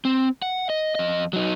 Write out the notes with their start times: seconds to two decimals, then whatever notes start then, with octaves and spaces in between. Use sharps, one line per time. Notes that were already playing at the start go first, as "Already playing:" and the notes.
0.05 C4
0.42 F#5
0.70 D#5
0.95 F2 D#5
1.33 F#3 D#4